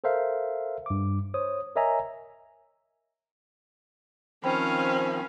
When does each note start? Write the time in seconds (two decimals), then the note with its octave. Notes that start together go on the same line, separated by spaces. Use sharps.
0.04 A4 A#4 C5 E5 F5
0.86 G2 D6
1.34 C5 C#5 D#6
1.76 A#4 C#5 D#5 E5 G#5 A#5
4.44 D#3 F3 C4 C#4 C5 F5 G5 B5